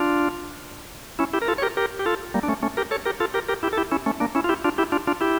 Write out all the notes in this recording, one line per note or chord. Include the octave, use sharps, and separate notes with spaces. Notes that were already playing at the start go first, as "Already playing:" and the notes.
Already playing: D4 F4
C#4 E4
E4 G4
A#4
F4 A4
C#5
G4 A#4
G4 A#4
G4
F4 A4
G3 A#3
D4
A3 C#4
A3 C#4
G4 A#4
A4 C#5
G4 A#4
F4 A4
G4 A#4
G4 A#4
E4 G4
A4
E4 G4
C#4 E4
A3 C#4
A#3 D4
C#4 E4
F4
E4 G4
D4 F4
E4 G4
D4 F4
D4 F4
E4 G4